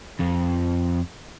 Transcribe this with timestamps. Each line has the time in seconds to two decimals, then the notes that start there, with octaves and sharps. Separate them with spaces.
0.20 F2